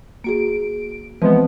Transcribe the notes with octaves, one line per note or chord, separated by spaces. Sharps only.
A#3 F#4 G#4 D7
E3 F3 G#3 B3 C4 B4